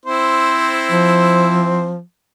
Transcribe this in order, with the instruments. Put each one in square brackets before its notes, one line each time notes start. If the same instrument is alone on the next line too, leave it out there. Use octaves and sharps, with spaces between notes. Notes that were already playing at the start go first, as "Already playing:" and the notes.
[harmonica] C4 E4 C5
[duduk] F3